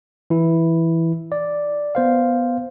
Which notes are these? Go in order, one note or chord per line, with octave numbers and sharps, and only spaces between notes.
E3 E4
D5
B3 C5 F5